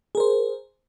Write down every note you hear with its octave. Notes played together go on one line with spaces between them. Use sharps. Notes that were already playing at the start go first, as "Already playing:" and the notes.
G#4 A#4 C5